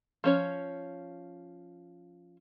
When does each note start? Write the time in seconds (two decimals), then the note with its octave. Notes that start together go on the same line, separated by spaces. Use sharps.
0.24 F3 C#4 C#5